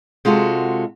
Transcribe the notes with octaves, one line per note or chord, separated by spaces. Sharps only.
C3 G#3 F4 F#4 A4